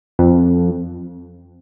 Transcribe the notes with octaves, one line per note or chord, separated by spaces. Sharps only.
F2